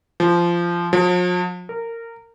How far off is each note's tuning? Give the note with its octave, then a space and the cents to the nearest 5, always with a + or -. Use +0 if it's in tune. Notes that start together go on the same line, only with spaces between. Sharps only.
F3 -15
F3 +45
A#4 -20